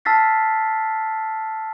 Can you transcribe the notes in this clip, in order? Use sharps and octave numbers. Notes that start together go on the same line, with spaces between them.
A5 E6 F6 A6 B6 C7